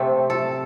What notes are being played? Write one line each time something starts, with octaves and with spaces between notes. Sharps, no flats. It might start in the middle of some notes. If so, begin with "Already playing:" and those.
Already playing: C3 A3 C4
A4